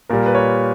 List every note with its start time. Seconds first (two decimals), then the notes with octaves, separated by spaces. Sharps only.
0.09 A#2 G3 A#4
0.26 B4
0.35 C#5